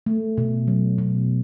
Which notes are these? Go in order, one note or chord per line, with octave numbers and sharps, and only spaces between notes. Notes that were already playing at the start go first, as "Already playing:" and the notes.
A3
B2
F#3
B2